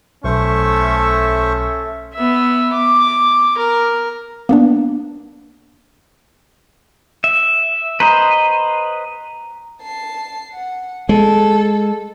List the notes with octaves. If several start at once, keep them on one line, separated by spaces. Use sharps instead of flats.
B1 A3 C#4 A4 C5 E5 C#6
B3 E5
D6
A#4
A#3 B3 D4
E5
B4 C5 D#5 A#5
A5 C7
F#5
G#3 A4